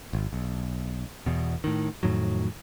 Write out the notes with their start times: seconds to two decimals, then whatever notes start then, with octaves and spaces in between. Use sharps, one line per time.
0.13 G#1
0.33 B1
1.26 E2 B2
1.64 A2 D#3
2.03 F2 A2 D#3 F#3